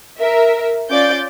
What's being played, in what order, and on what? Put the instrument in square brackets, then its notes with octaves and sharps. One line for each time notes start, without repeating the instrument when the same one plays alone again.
[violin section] A#4 E5
C#4 F4 D5 D6 G6 A6